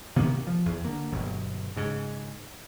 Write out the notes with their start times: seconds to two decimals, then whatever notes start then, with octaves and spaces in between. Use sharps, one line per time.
0.16 C3 D#3 A#3 B3
0.47 F3
0.66 E2
0.85 D3 A#3
1.12 G1 B2 F#3
1.77 G#2 C#3